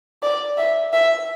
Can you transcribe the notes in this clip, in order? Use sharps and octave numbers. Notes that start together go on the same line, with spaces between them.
D5
E5
E5